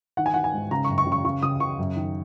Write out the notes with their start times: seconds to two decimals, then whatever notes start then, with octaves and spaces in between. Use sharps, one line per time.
0.17 D#3 F#5
0.26 G#5
0.34 D#3 F#5
0.44 G#5
0.53 G#2
0.71 C#3 A#5
0.84 C#6
0.89 F#2
0.98 C#6
1.07 C#3
1.12 C#6
1.24 C#3 C#6
1.43 C#3 D#6
1.60 C#3 C#6
1.79 F#2
1.96 D#3